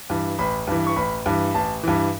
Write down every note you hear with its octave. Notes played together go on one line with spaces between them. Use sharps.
G2 E3
A1 B5
G2 E3
C#6
A1 B5
G2 E3
A1 A5
G2 E3